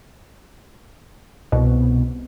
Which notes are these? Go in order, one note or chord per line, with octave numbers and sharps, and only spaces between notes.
C2 B2